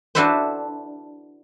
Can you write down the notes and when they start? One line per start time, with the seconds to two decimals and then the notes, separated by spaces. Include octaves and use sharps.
0.15 D4 E4 F#4 A4 B4 C5